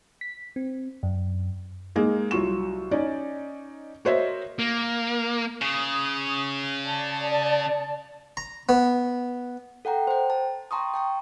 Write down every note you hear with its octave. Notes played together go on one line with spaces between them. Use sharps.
B6
C4
F#2
G#3 A#3 D#4 G#4
C2 F#3 F4 C#6 E7
C#4 D#4 D5
F#4 A#4 C5 C#5 D#5 E5
A#3
C#3 D#6
D5 A5
A#5
B3
A4 F#5 G5 A#5
C5 G5
A5
G5 A5 A#5 C6 C#6 D#6
G5 A5 C#6